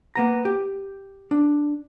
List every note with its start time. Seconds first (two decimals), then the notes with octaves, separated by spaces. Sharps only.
0.15 A#3 B3 A#5
0.45 G4
1.31 D4